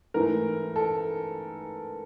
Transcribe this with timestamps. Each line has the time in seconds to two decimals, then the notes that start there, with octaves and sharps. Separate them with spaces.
0.14 G#2 E3 A3 A#4
0.76 A4